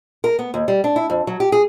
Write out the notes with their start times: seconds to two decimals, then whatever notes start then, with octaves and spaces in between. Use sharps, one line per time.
0.24 A#4
0.39 B3
0.54 D#2
0.68 G3
0.84 D4
0.96 E4
1.10 F2
1.27 F#3
1.40 G4
1.52 G#4